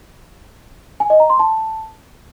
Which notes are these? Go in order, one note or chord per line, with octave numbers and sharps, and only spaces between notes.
G#5
D#5
A#5
C6
A5